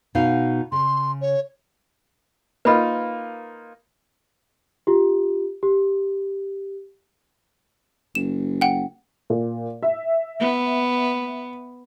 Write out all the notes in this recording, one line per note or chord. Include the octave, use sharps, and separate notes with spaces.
B2 D#4 F5
C#3 C6
C#5
A#3 D#4 F4 B4 B5
F4 G4
G4
F#1 E7
F#5 G5
A#2
E5
B3